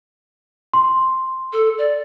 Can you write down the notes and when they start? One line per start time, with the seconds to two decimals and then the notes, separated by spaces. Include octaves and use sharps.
0.74 C6
1.53 A4
1.78 D5